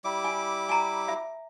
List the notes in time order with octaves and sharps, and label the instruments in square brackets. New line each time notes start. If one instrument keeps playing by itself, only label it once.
[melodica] G3 E4 D6
[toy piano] G#5
G#5 A#5
E5